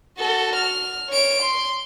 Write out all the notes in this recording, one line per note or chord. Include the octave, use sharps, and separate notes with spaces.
F#4 A4
F6
C#5 D7
C6